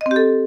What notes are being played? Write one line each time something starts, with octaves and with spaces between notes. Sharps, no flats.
D#5
C4
G4
A4